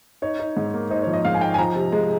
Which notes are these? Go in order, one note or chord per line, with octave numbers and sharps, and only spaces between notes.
D#4 C#5
D#4
G#2
A#3
D#4 C5
F3 C#5
D#5
G#2 F5
G#5
D#4 G5
G#5
F3 A#5
C3
G#3